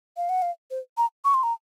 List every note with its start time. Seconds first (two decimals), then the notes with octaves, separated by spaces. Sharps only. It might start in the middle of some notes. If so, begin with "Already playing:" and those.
0.17 F5
0.29 F#5
0.42 F5
0.71 C5
0.97 A#5
1.25 C#6
1.34 C6
1.43 A#5